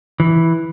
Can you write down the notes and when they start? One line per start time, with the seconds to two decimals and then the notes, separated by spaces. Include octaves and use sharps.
0.20 E3